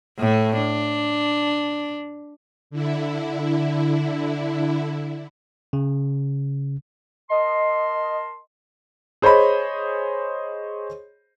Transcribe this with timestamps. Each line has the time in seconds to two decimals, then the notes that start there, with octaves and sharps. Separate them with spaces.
0.19 A2 A3
0.56 D4
2.70 D3 E4
5.73 C#3
7.30 A#4 D#5 A5 C6
9.22 G#4 C5 C#5 D#5 B5